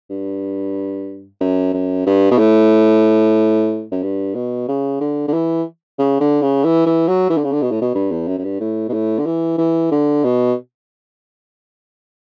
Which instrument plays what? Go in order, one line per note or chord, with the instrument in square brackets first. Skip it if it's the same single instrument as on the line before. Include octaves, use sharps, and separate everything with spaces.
[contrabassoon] G2
F#2
F#2
G2
B2
A2
F#2
G2
B2
C#3
D3
D3
E3
C#3
D3
C#3
E3
E3
F#3
E3
D3
C#3
D3
B2
A2
B2
G2
E2
F#2
F#2
G2
A2
B2
A2
D3
E3
E3
D3
B2